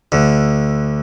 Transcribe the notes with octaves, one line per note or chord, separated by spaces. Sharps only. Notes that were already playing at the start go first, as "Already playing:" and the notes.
D2 D3